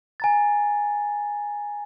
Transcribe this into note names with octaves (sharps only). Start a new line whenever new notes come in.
G#5 A#5 A6